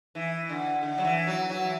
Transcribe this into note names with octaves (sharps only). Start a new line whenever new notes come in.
E3
D3
D3
F#3
E3
F#3
F#3
E3